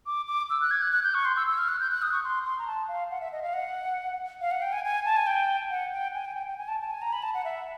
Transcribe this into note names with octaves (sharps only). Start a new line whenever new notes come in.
D6
D6
E6
F#6
G#6
F#6
F#6
G6
C#6
C6
E6
E6
F6
F#6
G6
F#6
D#6
C#6
C6
C6
A#5
A5
F5
F#5
E5
D#5
F5
F#5
F5
F#5
G5
G#5
G#5
A5
G#5
G5
F#5
G5
G#5
G5
G5
G5
G#5
A5
A5
G#5
A#5
B5
A5
F#5
E5